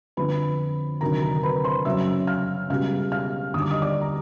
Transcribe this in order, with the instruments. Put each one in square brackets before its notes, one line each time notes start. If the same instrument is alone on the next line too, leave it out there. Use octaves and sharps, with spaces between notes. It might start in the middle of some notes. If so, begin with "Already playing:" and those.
[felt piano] F2 D3 F3 B4 B5
D2 C3 D#3 F#3 A#4 A#5
A#4 A#5
B4 B5
C5 C6
F#2 C#3 F#3 E5 E6
F5 F6
C#2 B2 G3 F5 F6
F5 F6
D#2 D3 G3 D#6
D6
D#5 D#6
D5 D6
A#5